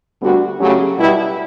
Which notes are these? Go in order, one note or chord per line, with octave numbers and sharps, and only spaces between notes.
D2 D3 G3 B3 F#4
C#3 F#3 A3 C#4 G4
B2 G3 B3 E4 G4